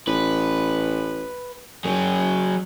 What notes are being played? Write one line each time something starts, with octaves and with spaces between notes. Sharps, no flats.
A1 B4
F#2 F#3 G#4